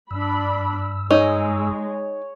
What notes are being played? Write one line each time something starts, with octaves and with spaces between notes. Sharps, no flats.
G2 D4 B5 E6
G#3 D#4 C#5